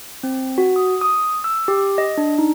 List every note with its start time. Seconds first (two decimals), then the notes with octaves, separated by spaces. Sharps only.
0.23 C4
0.58 F#4
0.76 D#6
1.01 D#6
1.44 E6
1.68 G4
1.98 D#5
2.17 D4
2.39 D#4